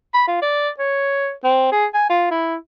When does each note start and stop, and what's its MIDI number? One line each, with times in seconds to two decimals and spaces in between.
0.14 0.23 83
0.27 0.39 65
0.42 0.69 74
0.79 1.31 73
1.44 1.70 60
1.72 1.86 68
1.94 2.08 80
2.09 2.27 65
2.31 2.55 64